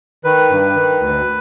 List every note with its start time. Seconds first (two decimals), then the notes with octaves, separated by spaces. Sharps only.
0.24 D#3 B4
0.50 G2
0.75 D#3
1.00 D2